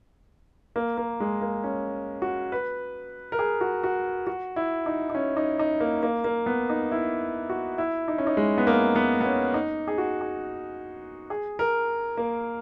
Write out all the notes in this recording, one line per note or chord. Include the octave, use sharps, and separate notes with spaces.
A#3
A#3
G#3
A#3
C#4
F#4
B4
A#4
G#4
F#4
F#4
F#4
E4
D#4
D#4
C#4
D#4
D#4
A#3
A#3
A#3
B3
D#4
E4
F#4
E4
D#4
C#4
D#4
G#3
B3
A#3
B3
B3
C#4
D#4
G#4
F#4
G#4
G#4
A#4
A#3